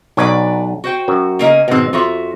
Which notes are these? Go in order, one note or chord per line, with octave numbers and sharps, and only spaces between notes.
B1 F#3 D4 B4 C#5 D5
F#4 C5 G5
F#2 F#3
C#3 A#3 D#5
G#2 B2 D#3 C4
F2 F4 F#4 C5 E5